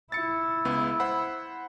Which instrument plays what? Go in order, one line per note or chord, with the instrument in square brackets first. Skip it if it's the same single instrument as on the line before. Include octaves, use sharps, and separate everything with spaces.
[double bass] E4 [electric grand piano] A6 C#7
[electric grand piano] C#2 B3
C5 F#5 B5